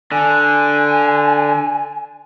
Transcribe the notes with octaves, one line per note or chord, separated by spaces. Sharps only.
D3 G#5